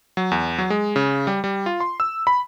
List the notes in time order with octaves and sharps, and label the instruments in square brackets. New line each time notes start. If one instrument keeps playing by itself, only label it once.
[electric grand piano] F#3
E2
F#3
G#3
C#3
G3
G3
F4
C6
E6
B5